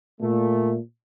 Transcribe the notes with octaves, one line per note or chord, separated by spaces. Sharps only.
A#2 A3